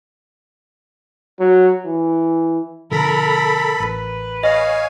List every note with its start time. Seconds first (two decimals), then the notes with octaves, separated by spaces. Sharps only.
1.40 F#3
1.86 E3
2.91 B2 D3 F3 A4 A#4 B5
3.80 A1 B4
4.43 C#5 D#5 F5 G#5